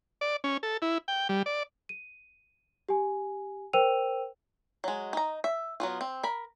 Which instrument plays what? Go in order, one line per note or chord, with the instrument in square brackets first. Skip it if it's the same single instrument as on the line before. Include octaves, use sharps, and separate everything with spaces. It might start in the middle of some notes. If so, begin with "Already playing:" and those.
[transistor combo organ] D5
C#4
A4
E4
G5
G3
D5
[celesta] D#7
G4 G#5
A#4 C5 G5 E6 D#7 F7
[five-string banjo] F#3 G#3
D#4 A#5
E5
F#3 B3 F4
C4
A#4 B5